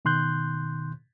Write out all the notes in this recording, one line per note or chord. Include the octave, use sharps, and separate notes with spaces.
B2 D#3 C6 F#6 G6